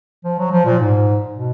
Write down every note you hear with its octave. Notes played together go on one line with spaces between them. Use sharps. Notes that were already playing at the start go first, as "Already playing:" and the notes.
F3
F#3
F3
A#2
G#2
B2